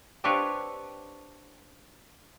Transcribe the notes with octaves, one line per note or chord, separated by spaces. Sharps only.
C4 D4 F4 G4 B4 C#5